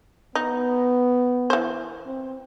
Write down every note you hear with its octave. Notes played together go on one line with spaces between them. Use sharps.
B3 D#4
E3 C5
C4